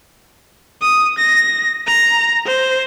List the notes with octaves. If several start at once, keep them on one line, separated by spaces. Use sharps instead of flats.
D#6
A#6
A#5
C5